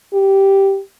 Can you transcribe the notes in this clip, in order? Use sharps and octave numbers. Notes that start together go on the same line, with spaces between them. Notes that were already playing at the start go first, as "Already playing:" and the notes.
G4